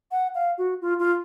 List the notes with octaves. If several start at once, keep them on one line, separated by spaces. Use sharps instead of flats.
F#5
F5
F#4
F4
F4